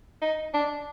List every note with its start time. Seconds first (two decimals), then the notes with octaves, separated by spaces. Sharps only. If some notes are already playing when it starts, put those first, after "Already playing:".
0.21 D#4
0.54 D4